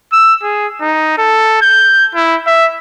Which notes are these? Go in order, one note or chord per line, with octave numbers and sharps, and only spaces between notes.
E6
G#4
D#4
A4
G6
E4
E5